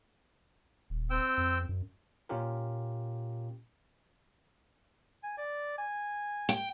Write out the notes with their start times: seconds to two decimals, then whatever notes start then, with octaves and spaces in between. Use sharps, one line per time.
0.90 D#1
1.10 C4 G5 E6
1.37 F2
1.69 F#2
2.29 A#2 A#3 C#4 F4 G4 A#4
5.23 G#5
5.38 D5
5.78 G#5
6.49 G5